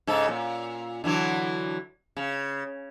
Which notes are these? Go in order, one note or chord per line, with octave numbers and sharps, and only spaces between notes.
G#2 C#3 A4
A#2
D3 E3 F#3
C#3